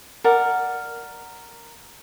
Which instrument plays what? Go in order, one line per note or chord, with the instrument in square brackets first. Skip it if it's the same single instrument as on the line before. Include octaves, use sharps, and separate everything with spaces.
[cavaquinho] A#4 D5 F#5